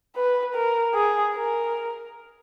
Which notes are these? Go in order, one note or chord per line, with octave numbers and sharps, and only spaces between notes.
B4
A#4
G#4
A#4